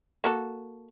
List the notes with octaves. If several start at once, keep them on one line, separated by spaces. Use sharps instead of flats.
A#3 F#4 A4